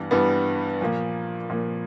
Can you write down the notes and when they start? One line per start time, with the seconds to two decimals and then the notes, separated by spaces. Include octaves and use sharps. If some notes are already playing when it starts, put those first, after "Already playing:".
Already playing: G2 E3 G3 B3
0.11 G2 E3 G3 B3
0.81 A#2 F3 A#3
1.50 A#2 F3 A#3